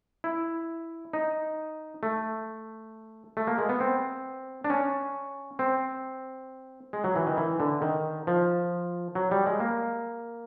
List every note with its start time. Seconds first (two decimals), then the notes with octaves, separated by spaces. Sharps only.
0.24 E4
1.13 D#4
2.03 A3
3.37 A3
3.47 A#3
3.58 G#3
3.69 B3
3.80 C4
4.64 D4
4.70 C#4
5.59 C4
6.93 G#3
7.04 F#3
7.16 E3
7.27 D#3
7.37 E3
7.60 D3
7.82 D#3
8.27 F3
9.15 F#3
9.31 G3
9.46 G#3
9.60 A#3